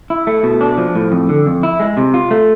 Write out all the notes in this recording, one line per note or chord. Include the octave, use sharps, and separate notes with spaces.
E4
A3
B2
D4
F3
A2
F2
D3
F2
E4
G#3
C3
F4
A3